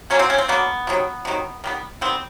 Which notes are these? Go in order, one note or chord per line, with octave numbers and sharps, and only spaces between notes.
D3 F#3 A#3 C#4
C4
C#4
C4
D3 F#3 A#3 B3
C3 D#3 F#3
C3 D#3 F#3
D#3 G3 B3
D#3 G3 B3 C4